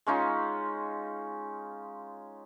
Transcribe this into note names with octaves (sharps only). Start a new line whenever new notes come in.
G#3 C#4 D#4 F4